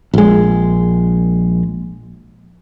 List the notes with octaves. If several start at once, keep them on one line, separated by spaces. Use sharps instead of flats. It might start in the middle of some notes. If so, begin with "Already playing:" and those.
A#1 G#3